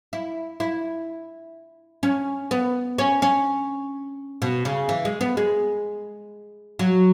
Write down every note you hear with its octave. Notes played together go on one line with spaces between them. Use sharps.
E4
E4
C#4
B3
C#4
C#4
B2
C#3
E3
G#3
B3
G#3
F#3